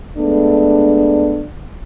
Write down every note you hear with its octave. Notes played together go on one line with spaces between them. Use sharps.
G#3 A3 B3 D4